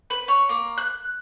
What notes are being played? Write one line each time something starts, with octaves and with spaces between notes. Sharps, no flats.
B4
C#5
A#3
F#6